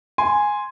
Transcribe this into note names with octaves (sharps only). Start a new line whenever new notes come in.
G#5 C6